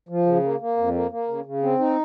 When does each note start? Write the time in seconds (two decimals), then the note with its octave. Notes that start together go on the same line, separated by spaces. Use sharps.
0.09 F3
0.26 C#3
0.43 A#3
0.60 A#3
0.77 F2
0.94 A#3
1.11 A#3
1.28 C#3
1.45 C#3
1.63 C4
1.79 D#4